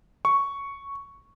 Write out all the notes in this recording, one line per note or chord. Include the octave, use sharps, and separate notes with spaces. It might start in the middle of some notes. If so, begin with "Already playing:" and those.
C#6